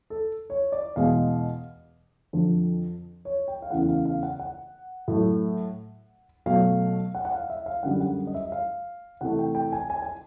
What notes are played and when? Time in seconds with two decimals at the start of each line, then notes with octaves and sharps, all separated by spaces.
0.10 A4
0.50 C#5
0.72 D5
0.96 E2 B2 G#3 F5
2.33 F2 D3 F3
3.25 C#5
3.48 G5
3.62 F5
3.71 E2 C#3 E3 A3 F#5
3.89 F5
4.05 F5
4.23 F#5
4.39 F#5
5.08 A2 F#3 A3
6.46 B2 F#3 A3 F5
7.15 F#5
7.25 F#5
7.32 F5
7.50 E5
7.66 F5
7.83 F#2 D3 G3 F#5
8.00 F#5
8.27 D#5
8.34 E5
8.52 F5
9.21 C3 E3 A3 F#5
9.39 G5
9.55 G5
9.72 G#5
9.90 G#5
10.02 G#5